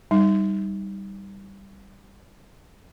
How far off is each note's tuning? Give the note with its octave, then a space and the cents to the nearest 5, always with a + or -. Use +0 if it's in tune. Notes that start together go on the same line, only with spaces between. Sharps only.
G3 +0 D#4 +0